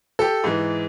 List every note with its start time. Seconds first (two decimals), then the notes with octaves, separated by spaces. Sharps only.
0.19 G4 A4
0.44 G#2 E3